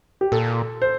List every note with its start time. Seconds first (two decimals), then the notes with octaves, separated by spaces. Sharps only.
0.21 G4
0.32 A#2 A4
0.82 C5